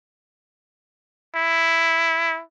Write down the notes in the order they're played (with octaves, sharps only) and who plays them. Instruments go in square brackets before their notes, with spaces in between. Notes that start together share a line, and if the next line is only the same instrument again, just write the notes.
[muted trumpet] E4